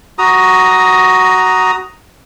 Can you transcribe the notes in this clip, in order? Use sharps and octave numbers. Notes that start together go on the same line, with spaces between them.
F#4 A#5 D#6